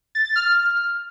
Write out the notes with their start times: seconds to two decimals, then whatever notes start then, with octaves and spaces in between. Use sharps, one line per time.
0.15 A6
0.25 A6
0.36 F6